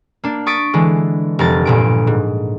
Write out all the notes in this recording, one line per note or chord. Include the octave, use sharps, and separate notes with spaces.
A#3 D4
C#6 D#6 A6 B6 D7
D3 E3 G#3
F1 A#4 A6
G1 A#2 D7
G#2